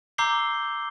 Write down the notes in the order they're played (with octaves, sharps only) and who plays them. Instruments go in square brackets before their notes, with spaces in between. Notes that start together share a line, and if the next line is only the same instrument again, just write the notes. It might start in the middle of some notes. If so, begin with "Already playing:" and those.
[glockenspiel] A#5 D6 E6 G6 C7 G7